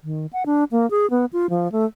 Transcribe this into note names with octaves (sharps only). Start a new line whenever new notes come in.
D#3
F#5
D4
A#3
G#4
B3
F4
F3
A3